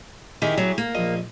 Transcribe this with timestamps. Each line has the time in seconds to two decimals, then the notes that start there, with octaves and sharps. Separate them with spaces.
0.42 D#3 E4 G4 G#4
0.58 F#3
0.78 A#3
0.95 A#1 D#5